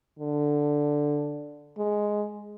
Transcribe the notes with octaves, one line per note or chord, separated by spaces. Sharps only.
D3
G#3